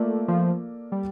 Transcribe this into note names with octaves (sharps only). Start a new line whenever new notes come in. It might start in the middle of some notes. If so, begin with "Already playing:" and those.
Already playing: A3 A#3 F4 A4 D5
F3
G3